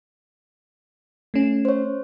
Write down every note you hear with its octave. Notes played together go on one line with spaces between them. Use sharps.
A3 C#4
C5 C#5